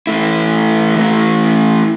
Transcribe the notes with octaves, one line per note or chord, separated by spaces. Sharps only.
E3 A3 E4
E3 A3 E4